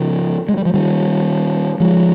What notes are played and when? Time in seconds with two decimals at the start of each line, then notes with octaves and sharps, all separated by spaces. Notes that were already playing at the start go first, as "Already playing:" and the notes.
Already playing: C#3 F3
0.49 G#3
0.57 G3
0.65 F3
0.74 D#3 G3
1.80 F3 G#3